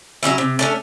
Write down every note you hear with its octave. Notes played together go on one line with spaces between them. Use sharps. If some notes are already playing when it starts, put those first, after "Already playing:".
F#3 G3 C#4 E4
C3
A3 C#4 D4